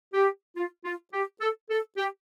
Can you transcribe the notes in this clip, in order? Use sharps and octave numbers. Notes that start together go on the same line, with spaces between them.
G4
F4
F4
G4
A4
A4
G4